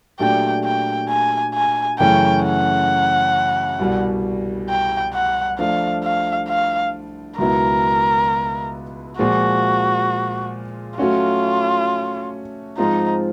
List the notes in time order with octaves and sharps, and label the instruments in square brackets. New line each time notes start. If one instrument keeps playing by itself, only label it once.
[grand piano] A#2 F#3 A3 D4 G4 [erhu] G5
[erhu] G5
G#5
G#5
[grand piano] F#2 C#3 E3 A3 C#4 [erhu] G5
[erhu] F#5
[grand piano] C2 B2 G3
[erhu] G5
F#5
[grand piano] F3 A3 D4 [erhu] F5
[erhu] F5
F5
[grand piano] C#2 B2 F#3 B3 E4 [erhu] A#4
[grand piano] A#2 F3 G#3 [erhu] F#4
[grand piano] F#3 A3 C#4 F#4 [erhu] F4
[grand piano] G#2 F3 G#3 C4 F4 [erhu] D#4